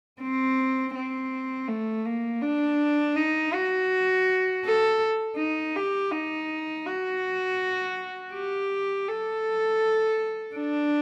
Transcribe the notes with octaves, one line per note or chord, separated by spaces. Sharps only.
C4
C4
A3
A#3
D4
D#4
F#4
A4
D#4
G4
D#4
F#4
G4
A4
D4